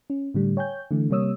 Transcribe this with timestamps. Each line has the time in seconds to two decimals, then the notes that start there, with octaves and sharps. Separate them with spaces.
0.10 C#4
0.34 A2 D3 G3
0.57 C#5 G5 G#5 G6
0.91 D3 E3 A3
1.10 C3 G3 A#3 C#5 D#6 E6